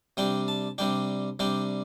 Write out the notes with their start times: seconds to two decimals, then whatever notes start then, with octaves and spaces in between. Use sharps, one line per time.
0.17 C3 G3 D4 G5
0.48 A5
0.78 C3 G3 D4 G5
1.39 C3 G3 D4 G5